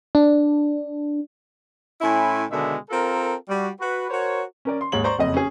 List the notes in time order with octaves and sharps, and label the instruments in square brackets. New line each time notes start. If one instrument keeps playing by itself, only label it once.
[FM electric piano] D4
[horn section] A2 C#4 E4 G#5 B5 C6
B2 D3 D#3 G#3 D4 E5
C4 F4 A4 A#4
G3 F#4
F#4 B4
F#4 A#4 C5 C#5
[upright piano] C#4 A#4 D5
C6
D#2 G#2 C#5 F#7
C5 D5 A#5 C6 C#6
F#1 F2 D#5
C#4 G#4